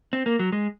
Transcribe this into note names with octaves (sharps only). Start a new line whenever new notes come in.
C4
A#3
F#3
G#3